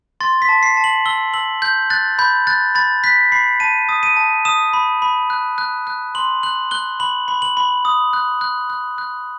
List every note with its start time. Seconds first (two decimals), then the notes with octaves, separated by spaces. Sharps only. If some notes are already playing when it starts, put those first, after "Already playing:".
0.20 C6 A6
0.42 B6
0.49 A5
0.63 C7
0.77 A5
0.84 F#7
1.06 E6 G7
1.34 E6 F#7
1.62 G6
1.90 F#6 A6
2.19 B5 G6
2.47 F#6 A6
2.75 B5 A6
3.04 F#6 B6
3.32 B5 C7
3.60 A5 D#7
3.89 D#6
4.03 D#7
4.17 A5
4.45 D#6 E7
4.73 B5
5.02 B5
5.30 F#6
5.58 F#6
5.87 F#6
6.15 C6 F#7
6.43 F#6 F#7
6.71 F#6 G7
7.00 B5 F#7
7.28 B5
7.42 F#7
7.57 B5
7.85 D#6
8.13 F#6
8.41 F#6
8.70 F#6
8.98 F#6